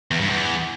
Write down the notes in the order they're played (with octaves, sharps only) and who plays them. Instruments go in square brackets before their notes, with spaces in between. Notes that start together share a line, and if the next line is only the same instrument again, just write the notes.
[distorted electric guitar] E2
G2
E2